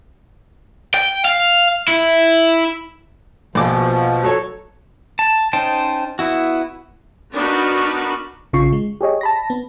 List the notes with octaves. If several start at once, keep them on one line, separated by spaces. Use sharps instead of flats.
G5
F5
E4
A#1 B2 F3 D6
F#3 A4 C#5
A5
C#4 D#4 C5 G5 A5
B3 E4 F#4
B3 D4 D#4 F#4 A#4 B4
A#1 C#3 F4 C#6 C7
G#3
G4 G#4 C#5 D#5
A5 B5 A#6
B3